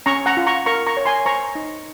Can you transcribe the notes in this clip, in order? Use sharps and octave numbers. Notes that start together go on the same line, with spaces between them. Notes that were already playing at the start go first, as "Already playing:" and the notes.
C#4 A#5 C#6
F#5 A#5
F4
A#5 C#6
A#4 A#5 C#6
A#5 C#6
C#5
G#5 C6
C5 A#5 C#6
D#4